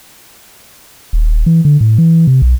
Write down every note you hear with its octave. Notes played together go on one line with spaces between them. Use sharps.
D#1
E3
D3
A2
E3
C3
B1